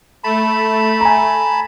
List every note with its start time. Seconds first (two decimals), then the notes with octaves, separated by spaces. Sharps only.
0.24 A3 A5 B5
1.01 G#5 A#5